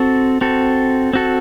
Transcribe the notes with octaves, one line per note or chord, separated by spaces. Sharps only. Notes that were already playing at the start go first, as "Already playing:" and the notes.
Already playing: C4 F#4 A4
C4 F#4 A4
C4 F#4 A4